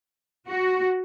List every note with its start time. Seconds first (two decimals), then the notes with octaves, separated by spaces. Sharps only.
0.48 F#4